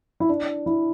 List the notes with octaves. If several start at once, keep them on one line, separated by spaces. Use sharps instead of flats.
E4
D4
E4